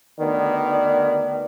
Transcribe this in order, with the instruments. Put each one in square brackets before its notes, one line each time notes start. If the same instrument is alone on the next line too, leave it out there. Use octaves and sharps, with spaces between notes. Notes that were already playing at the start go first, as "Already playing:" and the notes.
[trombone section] D2 D#3 B3 [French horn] D5